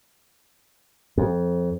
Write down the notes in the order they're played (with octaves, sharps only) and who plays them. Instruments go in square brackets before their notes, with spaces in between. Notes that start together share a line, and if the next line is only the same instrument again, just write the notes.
[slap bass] F2